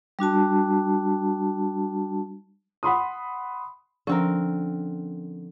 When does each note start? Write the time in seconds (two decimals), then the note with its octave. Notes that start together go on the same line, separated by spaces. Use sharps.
0.19 G3 D4 F#4 A5
2.83 F#5 B5 C6 D#6
4.07 D3 F3 C4 C#4 A#4